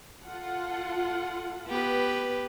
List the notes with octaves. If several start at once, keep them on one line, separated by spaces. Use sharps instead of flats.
F4 A4 F#5
B3 G4 B4